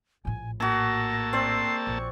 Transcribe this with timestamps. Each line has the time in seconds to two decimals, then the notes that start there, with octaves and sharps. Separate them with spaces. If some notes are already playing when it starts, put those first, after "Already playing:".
0.25 A#1 A2 G#5
0.60 A#3 F#4 G#4 A5 E6 A#6
1.33 C4 D5 C7
1.87 A#1 C#6